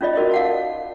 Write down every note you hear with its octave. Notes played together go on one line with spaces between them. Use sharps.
C#4 D#4 F4 D5 D#5
D#4 F#4 A#4 D5 D#5
F5 F#5 A5